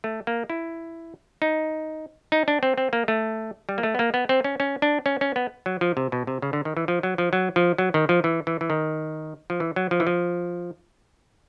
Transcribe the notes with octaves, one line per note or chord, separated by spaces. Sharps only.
A3
A#3
E4
D#4
D#4
D4
C4
C4
A#3
A3
G3
A#3
A3
B3
A#3
B3
C4
C#4
C#4
D4
C#4
C#4
B3
F#3
F3
C3
B2
C3
C#3
D3
D#3
E3
F3
F#3
F3
F#3
F3
F#3
D#3
F3
E3
E3
E3
D#3
F3
E3
F#3
F3
E3
F3